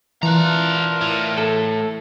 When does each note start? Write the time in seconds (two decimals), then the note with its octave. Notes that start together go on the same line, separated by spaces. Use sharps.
0.23 E3 D4 E4 F4 A#4 A#5 F#6
1.01 A2
1.38 A4